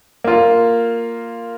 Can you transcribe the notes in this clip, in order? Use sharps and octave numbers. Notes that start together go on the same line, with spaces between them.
A#3 F4